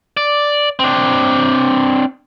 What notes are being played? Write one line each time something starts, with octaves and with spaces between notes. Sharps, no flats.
D5
C4 D4